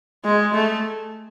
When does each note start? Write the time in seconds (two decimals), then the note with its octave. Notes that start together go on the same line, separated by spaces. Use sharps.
0.25 G#3
0.53 A3